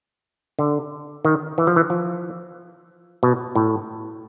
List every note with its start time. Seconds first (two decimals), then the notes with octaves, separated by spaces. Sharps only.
0.59 D3
1.25 D#3
1.58 E3
1.67 F3
1.76 E3
1.90 F3
3.23 B2
3.55 A2